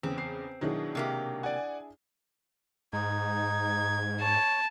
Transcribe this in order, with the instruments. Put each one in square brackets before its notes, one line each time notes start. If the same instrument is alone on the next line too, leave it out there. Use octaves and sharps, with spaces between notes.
[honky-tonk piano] E2 C#3 [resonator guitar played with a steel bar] C4
[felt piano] C7
[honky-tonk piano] B2 D#3 F#3 [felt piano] D4 E4 G#4
[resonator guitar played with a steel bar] C3 A#3 G4
[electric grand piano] D5 F#5 [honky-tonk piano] G#5
[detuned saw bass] G#2 [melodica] D#4 [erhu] G#6
[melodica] C#5 [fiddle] A5